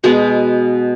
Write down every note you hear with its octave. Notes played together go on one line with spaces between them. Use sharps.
B2 G#3 B3 G#4